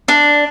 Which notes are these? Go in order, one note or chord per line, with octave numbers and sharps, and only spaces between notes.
D4